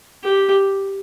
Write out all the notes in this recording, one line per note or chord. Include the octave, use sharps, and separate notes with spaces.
G4